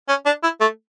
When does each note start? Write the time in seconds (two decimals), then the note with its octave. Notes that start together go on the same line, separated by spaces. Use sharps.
0.09 C#4
0.26 D4
0.43 E4
0.61 A3